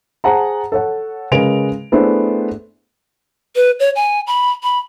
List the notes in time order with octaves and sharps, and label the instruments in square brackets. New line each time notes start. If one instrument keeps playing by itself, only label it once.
[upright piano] G#4 C5 F#5 A5 A#5
A4 C#5 F#5
C#3 G#3 A#4 B4 D7 F7
A3 B3 D4 E4 G#4 C5
[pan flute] B4
C#5
G#5
B5
B5